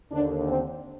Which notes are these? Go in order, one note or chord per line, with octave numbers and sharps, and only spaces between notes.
D#2 D3 D4
C4